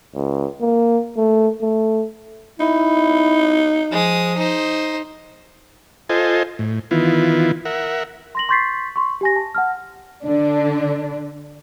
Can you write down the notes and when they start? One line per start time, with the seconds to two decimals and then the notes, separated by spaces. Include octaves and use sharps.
0.14 C#2
0.60 A#3
1.17 A3
1.62 A3
2.60 D#4 E4
3.92 F3 G#3 D#6
4.37 D#4 C5
6.09 F4 A4 C5 D#5 G#5
6.59 A2
6.91 D#3 E3 B3 E4 F4
7.65 A#4 E5 F#5
8.35 C6 A#6 F#7
8.49 C6 C#6 G6 A6 B6 C7
8.96 C6 C#6
9.21 G4 G#5 A#6
9.36 A5
9.55 F#5 A5 F6
10.23 D3 D4